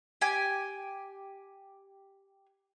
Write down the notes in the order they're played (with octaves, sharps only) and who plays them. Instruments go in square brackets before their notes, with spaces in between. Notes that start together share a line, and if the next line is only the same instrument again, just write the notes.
[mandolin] G4 G#5